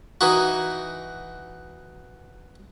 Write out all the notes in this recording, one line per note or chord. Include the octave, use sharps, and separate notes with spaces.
E3 D#4 F#4